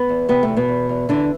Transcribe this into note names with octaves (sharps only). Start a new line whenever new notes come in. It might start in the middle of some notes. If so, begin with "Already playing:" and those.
Already playing: B3
E2
C3 B3
A3
E2
B2 B3
E2
E2
D3 E3 D4